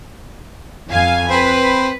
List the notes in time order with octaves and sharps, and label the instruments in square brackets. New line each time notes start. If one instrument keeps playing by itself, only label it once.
[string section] F2 F5 G#5
[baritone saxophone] C4 [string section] B4